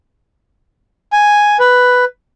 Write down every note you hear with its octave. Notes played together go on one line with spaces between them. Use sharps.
G#5
B4